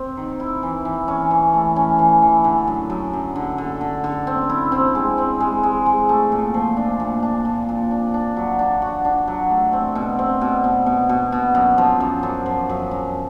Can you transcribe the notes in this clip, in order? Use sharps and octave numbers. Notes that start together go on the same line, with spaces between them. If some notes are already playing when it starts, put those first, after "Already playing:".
Already playing: C4
D#3
E4
E3
E3
C#4
E3
A3
C#4
E3
E3
D3
F#2
F#2
F#2
D3
D3
D3
D3
C4
E4
C4
G#3
C4
G#3
G#3
G#3
A3
A#2
F3
D4
A#2
D4
A#2
A#2
D4
D4
F#3
D4
F#4
D4
F#3
A3
C4
B2
C4
B2
B2
B2
B2
B2
F#2
F3
F#2
F#2
F3
F#2
F#2